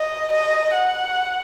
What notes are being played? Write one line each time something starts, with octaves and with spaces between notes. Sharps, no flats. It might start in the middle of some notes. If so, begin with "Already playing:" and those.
Already playing: D#5
D#5
F#5